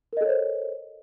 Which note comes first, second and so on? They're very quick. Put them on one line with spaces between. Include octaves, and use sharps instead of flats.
A#4 D#5 A4 C#5 C5